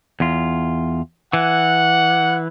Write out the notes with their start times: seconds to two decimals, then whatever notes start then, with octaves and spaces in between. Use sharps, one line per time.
0.20 E2 F4
1.33 E3 F#5